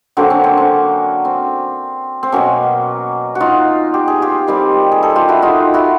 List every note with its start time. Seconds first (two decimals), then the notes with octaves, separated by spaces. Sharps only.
0.17 D3 F#3 A#3 C4
0.30 C#4
0.44 C4
0.57 C#4
1.25 C4
2.23 C4
2.32 B2 F#3 A#3 C#4
3.35 F#4
3.40 D#4 F4
3.94 G4
4.08 G#4
4.22 F4 G4
4.47 D#3 G3 C4
4.92 G#4
5.02 G4 A4
5.15 F4 G4
5.29 E4 F#4
5.42 D#4 F4
5.74 E4 F#4